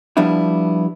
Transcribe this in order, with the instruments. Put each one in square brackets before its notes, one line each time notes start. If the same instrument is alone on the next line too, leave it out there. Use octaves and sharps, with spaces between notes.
[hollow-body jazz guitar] F3 G3 B3 D4 E4